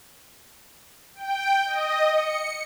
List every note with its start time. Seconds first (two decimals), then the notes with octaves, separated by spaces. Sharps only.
1.15 G5
1.65 D#5
2.10 C#7